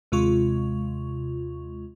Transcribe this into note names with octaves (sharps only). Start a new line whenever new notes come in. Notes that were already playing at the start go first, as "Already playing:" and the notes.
D#2 C3 G#3 F4 C#6